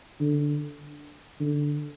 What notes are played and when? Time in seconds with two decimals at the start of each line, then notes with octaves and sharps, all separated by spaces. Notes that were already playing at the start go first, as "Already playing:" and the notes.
0.20 D3
1.40 D3